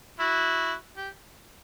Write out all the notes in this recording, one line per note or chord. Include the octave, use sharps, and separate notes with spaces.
E4 F#4
G4